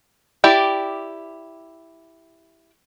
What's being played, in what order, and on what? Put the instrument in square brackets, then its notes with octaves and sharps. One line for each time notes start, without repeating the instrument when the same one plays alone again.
[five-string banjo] E4 G4 D5